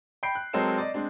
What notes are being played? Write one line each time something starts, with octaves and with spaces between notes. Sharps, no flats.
G5 B5 G6 C7 D7
F#6
F#3 G#3 C4 A4 A#4 E7
D5 D#5
G#3 C4 D4